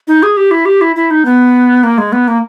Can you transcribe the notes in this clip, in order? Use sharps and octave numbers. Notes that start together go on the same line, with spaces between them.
D#4
G#4
G4
E4
G4
E4
E4
D#4
B3
A#3
G#3
B3
A#3